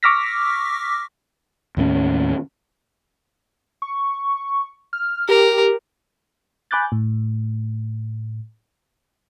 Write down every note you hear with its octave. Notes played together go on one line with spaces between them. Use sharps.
C#6 D6 E6 F6 A#6 B6
D#2 A2 G#3 C#4
C#6
F6
G4 A#4
G#5 B5 D6 F#6 G6 A6
A2